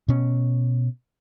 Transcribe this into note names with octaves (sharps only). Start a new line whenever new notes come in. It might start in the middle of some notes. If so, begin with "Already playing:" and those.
B2 C#4